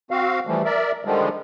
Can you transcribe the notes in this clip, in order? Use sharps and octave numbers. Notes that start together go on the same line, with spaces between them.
C4 F#4 F5
E3 F3 G3 A3
A#4 D5 E5
D3 D#3 F3 G3 G#3